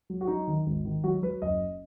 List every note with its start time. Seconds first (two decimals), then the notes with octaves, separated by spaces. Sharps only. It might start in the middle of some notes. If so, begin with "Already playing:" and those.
0.10 F#3
0.21 F#4
0.27 F#3 D#4
0.47 D#3
0.66 G#1
0.85 D#3
1.04 F#3 F#4
1.22 F#3 B4
1.42 F#1 D#5